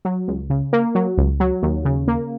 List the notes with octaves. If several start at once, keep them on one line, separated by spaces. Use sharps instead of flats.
F#3
C#2
C#3
A#3
F#3
C#2
F#3
D#2
C#3
A#3